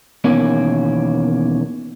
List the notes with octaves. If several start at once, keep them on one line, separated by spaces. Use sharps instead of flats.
E2 B2 D#3 A#3 C#4